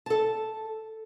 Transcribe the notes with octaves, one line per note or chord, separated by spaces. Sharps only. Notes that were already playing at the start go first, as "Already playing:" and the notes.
A4 A5